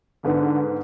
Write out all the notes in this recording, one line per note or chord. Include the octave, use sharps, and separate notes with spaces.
G#2 D3 B3